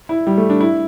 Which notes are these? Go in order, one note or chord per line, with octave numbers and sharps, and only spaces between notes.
E4
G3
A3
D4
E4